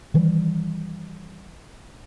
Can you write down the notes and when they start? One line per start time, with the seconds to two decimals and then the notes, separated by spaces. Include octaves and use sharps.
0.14 D#3 E3 G3